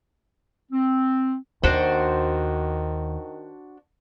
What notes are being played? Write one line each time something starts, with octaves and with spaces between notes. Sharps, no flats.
C4
D#2 D#3 D4 F#4 C5